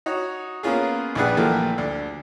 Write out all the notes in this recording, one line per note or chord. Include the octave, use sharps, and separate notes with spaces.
D#4 F#4 C#5
A#3 B3 C#4 F4 G#4
A#1 G3 D4 G#4 B4 F#5
A#2 E3 F3 G3 A3 A#3
D2 D4